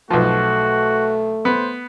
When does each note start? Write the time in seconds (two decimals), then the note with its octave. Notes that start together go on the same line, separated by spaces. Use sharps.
0.10 B1 F3 A3 F#4
1.45 B3 C5